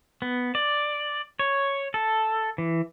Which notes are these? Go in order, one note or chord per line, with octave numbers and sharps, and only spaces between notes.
B3
D5
C#5
A4
E3